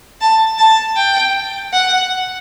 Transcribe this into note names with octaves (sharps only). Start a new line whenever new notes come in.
A5
A5
G5
F#5